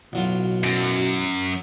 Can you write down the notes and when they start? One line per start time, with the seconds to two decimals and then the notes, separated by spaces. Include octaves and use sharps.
0.13 A1 B2 F#3 F4
0.63 F#2